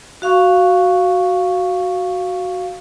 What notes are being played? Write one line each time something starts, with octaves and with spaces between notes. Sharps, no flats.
F#4 F5 C#6